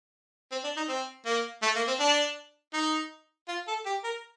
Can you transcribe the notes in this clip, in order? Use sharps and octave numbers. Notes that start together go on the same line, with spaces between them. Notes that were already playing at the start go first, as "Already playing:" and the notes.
C4
D4
D#4
C4
A#3
A3
A#3
C4
D4
D#4
F4
A4
G4
A#4